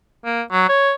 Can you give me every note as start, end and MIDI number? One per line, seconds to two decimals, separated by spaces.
0.25 0.42 58
0.52 0.65 54
0.69 0.93 73